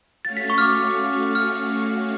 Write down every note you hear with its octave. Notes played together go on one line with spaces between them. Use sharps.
A3 C#4 F#4 C#5 F5 A6
B6
C#6
F6
D6
F6